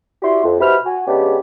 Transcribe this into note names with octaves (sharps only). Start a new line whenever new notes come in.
E4 F#4 G4 D5 C6
F2
B2 E4 G4 C5 B5 F6
F#4 G#5
C#3 G#3 B3 D4 G4